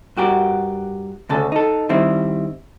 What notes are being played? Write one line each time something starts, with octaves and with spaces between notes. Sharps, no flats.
G2 F#4 G4 A#4
D2 C#3 A4
D#4 A4
D#3 G3 C4 E4